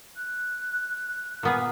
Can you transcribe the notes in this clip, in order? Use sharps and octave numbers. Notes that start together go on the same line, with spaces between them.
F#6
A#2 B3 G#4 B4 A#5 F6